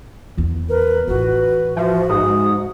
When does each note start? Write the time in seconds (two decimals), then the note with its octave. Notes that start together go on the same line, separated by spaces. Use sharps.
0.37 E2 B3
0.69 A#4 B4
1.08 A1 F4 F#4 B4
1.77 F3 F#4 E5
2.09 G#2 D#6